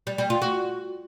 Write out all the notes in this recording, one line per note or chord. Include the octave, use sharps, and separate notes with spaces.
G3
G3
F4
F#4